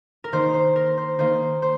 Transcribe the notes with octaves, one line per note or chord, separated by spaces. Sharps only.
A#4
D#3 A#3 D#4 C5
C5
A#4
C5
D#3 A#3 D#4 C5
C5